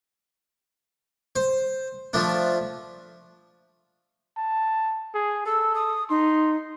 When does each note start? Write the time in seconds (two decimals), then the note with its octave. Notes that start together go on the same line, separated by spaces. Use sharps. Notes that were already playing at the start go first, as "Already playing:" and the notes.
1.36 C5
2.13 F3 A3 D4
4.37 A5
5.14 G#4
5.46 A4 E6
5.75 D#6
6.10 D#4 C6